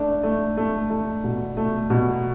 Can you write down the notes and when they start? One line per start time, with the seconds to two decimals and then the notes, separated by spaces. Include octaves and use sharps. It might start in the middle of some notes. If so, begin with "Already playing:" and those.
Already playing: A3 D4
0.23 A3
0.57 A3
0.90 A3
1.24 B2
1.57 A3
1.90 B2